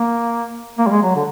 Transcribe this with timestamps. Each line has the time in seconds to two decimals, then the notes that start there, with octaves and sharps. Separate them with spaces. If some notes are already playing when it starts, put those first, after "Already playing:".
Already playing: A#3
0.78 A#3
0.87 G3
0.91 G#3
1.03 F#3
1.15 D3